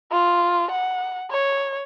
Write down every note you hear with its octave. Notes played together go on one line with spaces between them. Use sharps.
F4
F#5
C#5